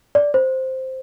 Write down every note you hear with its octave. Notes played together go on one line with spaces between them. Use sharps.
D5
C5